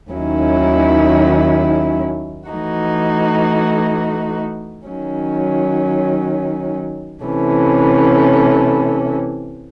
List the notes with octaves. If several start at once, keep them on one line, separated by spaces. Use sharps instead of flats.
D#2 D#3 F#3 C#4 E4
E3 A3 D#4 F#4
D#3 F#3 C#4
C3 E3 A3 C#4